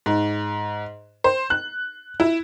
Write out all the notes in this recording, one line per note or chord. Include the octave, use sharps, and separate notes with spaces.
G#2
C5
F#6
E4